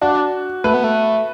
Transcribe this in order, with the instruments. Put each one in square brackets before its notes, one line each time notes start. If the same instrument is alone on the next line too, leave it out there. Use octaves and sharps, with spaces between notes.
[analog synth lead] D4 [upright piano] F#4
[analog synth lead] A3 [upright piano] B4
[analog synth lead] B3
A3